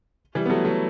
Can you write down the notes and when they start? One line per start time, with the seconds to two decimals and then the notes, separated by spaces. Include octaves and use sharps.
0.35 E3 G3
0.46 B3
0.49 F#3 A3
0.65 F#3 A3